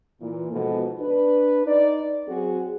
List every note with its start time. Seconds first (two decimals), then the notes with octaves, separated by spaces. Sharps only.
0.20 A#2 E3
0.52 G#2 B2 F3 B3 F#4 A4
1.00 D4 B4
1.66 D#4 D5
2.27 F#3 C4 F#4 G#4